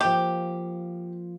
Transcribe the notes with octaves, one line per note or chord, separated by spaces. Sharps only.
F3 A#3 G4